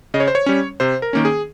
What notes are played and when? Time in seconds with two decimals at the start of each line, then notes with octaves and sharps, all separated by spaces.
0.14 C#3 D#5
0.20 C#5
0.28 C5
0.35 C#5
0.46 G3 C#4
0.80 C3 C5
1.02 A#4
1.13 D#3 A#3 C#4
1.25 G#4